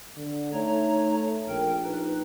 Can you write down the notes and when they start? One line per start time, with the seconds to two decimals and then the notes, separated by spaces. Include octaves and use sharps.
0.17 D3
0.53 A3 D#4 C#5 A#5
1.48 A#1 A#4 G5
1.85 D#4 B4